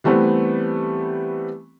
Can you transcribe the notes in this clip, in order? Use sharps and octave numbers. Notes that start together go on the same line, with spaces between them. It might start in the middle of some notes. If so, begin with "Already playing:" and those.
E3 G3 A3 B3 C4